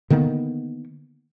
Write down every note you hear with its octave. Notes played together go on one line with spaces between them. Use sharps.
D3 D#3 A#3 B3